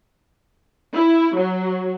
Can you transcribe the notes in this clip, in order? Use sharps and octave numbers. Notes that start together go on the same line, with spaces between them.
E4
F#3